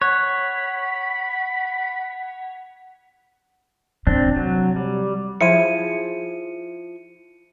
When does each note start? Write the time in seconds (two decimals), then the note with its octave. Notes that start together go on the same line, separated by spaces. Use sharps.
0.01 C#5 F#5 B5 F#6
4.07 C3 C4 D4
4.36 F#3
4.76 G3
5.41 F3 E4 G#4 C#7 D#7